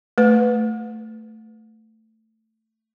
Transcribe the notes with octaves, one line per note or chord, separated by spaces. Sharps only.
A3 B4